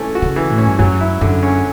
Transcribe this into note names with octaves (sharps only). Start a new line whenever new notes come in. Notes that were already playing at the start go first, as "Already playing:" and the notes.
Already playing: E3 A3 C#4
F#4
C#3
E3
A2
C#4
G2
F#2 F#3
E4
F#2 D3
C#4